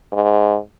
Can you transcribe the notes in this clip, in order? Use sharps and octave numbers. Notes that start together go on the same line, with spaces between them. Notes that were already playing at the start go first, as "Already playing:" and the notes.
G#2